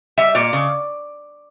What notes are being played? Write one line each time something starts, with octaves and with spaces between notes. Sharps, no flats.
G3 E5
A#2 D5
C#3